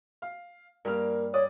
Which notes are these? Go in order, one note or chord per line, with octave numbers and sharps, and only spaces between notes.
F5
G2 A#3 A#4 F6
C#5 D5 D#6